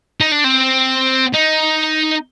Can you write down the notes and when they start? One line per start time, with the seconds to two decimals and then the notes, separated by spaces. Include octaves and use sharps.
0.20 D#4
0.31 D4
0.44 C4
1.33 D#4